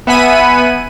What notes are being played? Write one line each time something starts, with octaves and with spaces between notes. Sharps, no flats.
B3 E5 F#5 G#5 B5 D#7